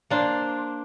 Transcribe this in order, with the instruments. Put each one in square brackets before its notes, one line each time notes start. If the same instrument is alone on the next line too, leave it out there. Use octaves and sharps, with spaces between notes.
[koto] A#3 D4 C5